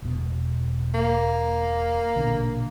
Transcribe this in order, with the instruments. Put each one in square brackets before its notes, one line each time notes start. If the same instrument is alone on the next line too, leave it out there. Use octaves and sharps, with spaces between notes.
[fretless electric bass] E1 B2
[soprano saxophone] A#3
[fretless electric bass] A#1 B2 D3